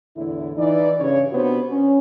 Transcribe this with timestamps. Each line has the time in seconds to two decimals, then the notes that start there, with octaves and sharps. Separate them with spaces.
0.16 E2 A2 D3 E4
0.57 E3 D#4 D5
1.00 G2 C#3 C#5
1.32 C3 B3 D4 F#4 C5
1.70 C#4